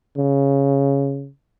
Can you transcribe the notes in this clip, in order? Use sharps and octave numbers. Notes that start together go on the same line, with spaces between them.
C#3